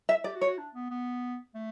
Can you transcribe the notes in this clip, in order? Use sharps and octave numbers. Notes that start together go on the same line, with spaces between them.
E5
G4 D5
F#4
C#5
F#4
D4
B3
B3
A3